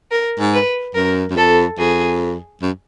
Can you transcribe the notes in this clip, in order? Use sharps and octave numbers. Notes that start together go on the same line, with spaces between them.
A#4
G#2
B4
F#2 A#4
F#2
F2 A4
F2 G#4
F#2